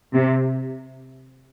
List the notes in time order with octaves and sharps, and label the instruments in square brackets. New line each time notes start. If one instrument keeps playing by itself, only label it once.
[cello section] C3